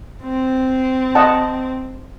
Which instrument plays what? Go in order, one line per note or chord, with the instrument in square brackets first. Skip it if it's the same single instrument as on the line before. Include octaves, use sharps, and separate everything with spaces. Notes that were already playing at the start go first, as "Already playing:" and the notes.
[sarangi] C4
[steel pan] D#5 F#5 A5